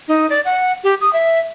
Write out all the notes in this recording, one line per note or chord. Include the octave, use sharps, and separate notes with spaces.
D#4
D5
F#5
G4
D#6
E5